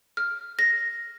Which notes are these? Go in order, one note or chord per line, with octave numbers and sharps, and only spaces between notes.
F6
A#6